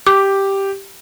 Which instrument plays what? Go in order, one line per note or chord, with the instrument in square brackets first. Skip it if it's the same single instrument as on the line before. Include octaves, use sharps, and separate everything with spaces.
[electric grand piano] G4 [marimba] D6